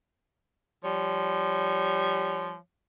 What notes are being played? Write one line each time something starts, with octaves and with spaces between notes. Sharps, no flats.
F3 G3 C#5